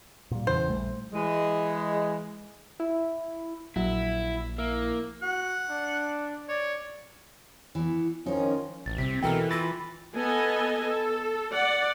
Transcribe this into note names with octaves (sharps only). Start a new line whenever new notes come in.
A#2 G3
E2 C#3 E3 C5
A#1 G3 A3
E3 G#3
E4
A#1 F#3 E4
A#3 E4
F#4 F#5
D4
C#5 D5
E3 B3
D#3 F3 G#3 C#4 D#4
A1 A6
C2 C3 C4 B6
B2 E3 A4 A#4 G5
F4 B5 A6 A#6
B3 A4 D#5 G#5
A4
D5 F#5